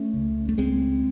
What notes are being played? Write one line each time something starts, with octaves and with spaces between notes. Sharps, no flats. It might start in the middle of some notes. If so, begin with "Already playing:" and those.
Already playing: A3 C#4
C#2 C#3
A3
C#2 C#3 G#3 C4